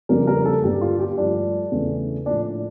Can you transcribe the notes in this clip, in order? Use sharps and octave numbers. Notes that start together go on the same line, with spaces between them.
F2 C#3 G3 A#3 A#4
A#4
A4
G2 D3 G3 A#3 G4
F4
G4
G2 F3 A3 D4
E2 C#3 E3 A3
A2 F3 A#3 D4